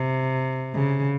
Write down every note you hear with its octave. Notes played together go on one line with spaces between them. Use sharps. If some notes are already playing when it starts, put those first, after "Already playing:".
Already playing: C3
C#3